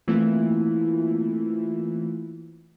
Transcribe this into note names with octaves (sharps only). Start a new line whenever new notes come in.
E3 A3 A#3 C4 E4 F4